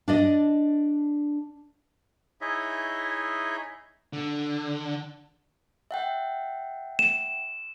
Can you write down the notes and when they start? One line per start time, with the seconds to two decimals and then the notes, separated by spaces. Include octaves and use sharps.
0.08 D4 D5 D#5
2.41 D#4 E4 G#4 C#5 D#5 E5
4.13 D3
5.91 E5 F#5 G5
6.99 E7